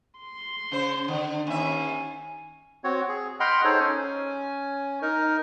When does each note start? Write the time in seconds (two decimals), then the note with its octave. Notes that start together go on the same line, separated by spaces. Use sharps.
0.18 C6
0.71 C#3 C5
1.08 D3
1.47 D#2 C#4 E5 G#5
2.84 C4 F#4 C#5
3.08 G#4
3.40 D#5 F#5 G5 B5 C6 F6
3.64 D#4 G#4 A4 C5 C#5
3.80 C#4 G#5
5.02 D#4 A#4